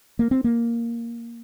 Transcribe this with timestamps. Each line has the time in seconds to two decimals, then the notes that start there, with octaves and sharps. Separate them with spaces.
0.19 A#3
0.31 C4
0.44 A#3